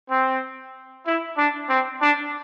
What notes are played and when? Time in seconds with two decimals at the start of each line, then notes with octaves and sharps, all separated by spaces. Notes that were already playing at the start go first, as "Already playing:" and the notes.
0.10 C4
1.06 E4
1.37 D4
1.69 C4
2.01 D4